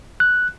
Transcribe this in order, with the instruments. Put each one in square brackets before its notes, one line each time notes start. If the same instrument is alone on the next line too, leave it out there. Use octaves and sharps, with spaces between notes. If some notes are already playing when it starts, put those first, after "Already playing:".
[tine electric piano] F#6